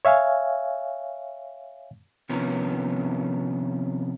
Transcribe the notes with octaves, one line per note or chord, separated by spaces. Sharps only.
C#5 E5 F5 G#5
C3 D#3 F3 B3 C#4